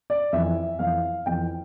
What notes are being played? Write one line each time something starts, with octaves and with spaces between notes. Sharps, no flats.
D5
F2 E3 E5
F2 E3 F5
F2 E3 G5